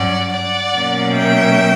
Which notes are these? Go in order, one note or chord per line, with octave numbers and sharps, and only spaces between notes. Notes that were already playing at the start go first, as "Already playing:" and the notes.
Already playing: G2 F#3 C#4 D5 F#5
D5 F#5
B2 F#3 A#3 C#4
E5 G5